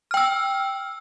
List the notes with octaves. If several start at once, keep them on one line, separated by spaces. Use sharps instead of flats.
G5 E6 F6